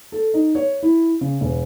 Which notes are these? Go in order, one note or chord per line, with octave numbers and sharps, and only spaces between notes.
A4
D#4
C#5
E4
C#3
E1